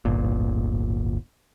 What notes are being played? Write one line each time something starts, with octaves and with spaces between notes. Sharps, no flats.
D1 G1 A#2